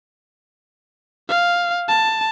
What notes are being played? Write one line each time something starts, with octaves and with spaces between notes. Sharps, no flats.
F5
A5